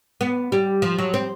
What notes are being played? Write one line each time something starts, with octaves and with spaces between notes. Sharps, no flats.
B3
G3
F3
F#3
C4